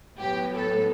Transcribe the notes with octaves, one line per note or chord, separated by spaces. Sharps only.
A2 F#3 B3 G4
A4